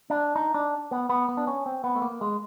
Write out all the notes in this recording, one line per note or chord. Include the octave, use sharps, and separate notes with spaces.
D4
D#4
D4
B3
B3
B3
D4
C#4
C4
B3
A3
A#3
G#3